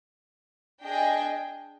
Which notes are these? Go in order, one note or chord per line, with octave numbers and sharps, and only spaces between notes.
D4 G#4 D#5 G5